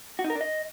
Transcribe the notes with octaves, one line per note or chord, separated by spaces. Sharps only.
F#4
D#4
A#4
D4
D#5